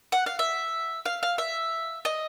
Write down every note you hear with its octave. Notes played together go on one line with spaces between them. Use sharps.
F#5
F5
E5
F5
F5
E5
D#5